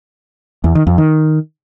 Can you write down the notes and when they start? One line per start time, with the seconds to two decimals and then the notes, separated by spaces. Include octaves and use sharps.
0.64 E2
0.75 D#3
0.87 F2
0.98 D#3